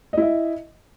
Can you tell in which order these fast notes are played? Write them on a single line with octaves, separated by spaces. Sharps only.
D#5 E4 E5